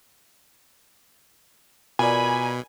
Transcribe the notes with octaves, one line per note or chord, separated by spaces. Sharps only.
B2 F4 A#4 D5 G#5 B5